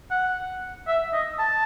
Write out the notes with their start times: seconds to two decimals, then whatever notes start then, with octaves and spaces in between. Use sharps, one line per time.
0.11 F#5
0.88 E5
1.13 D#5
1.39 A5